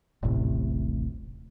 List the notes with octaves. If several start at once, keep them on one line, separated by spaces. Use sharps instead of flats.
D#1 A1 A2 C3